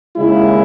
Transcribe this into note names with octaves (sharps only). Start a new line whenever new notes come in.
D#2 C#3 G#3 E4